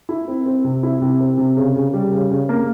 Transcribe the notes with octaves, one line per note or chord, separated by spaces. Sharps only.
E4
C4
C4
C3
E4
C3
C4
C3
C#3
C#3
G3
C#3
C#3
A#3